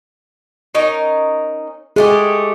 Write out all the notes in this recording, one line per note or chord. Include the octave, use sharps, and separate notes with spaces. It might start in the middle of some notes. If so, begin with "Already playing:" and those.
C#4 D#4 A#4
G#3 A3 G4 G#4